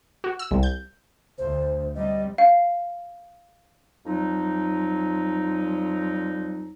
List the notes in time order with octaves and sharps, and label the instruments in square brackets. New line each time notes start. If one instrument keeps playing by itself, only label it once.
[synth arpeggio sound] F#4
E6
C2
G6
[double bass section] D2 [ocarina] C5
[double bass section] C3 G3 [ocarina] D#5
[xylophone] F5
[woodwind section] F2 F#3 G3 D#4